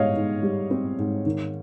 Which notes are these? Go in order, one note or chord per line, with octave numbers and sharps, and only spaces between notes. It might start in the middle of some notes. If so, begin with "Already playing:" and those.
Already playing: G#2 G3 C#5 D#5 F5
G#2
G3
C4
G#2
D#3